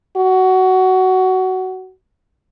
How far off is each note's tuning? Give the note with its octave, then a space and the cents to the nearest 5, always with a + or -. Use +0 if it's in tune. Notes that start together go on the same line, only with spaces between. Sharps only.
F#4 +15